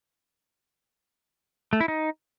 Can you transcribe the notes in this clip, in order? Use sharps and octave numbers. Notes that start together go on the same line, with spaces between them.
A3
E4
D#4